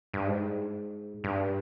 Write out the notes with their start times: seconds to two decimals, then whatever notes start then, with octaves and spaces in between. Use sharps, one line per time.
0.13 G2
0.27 G#2
1.24 G2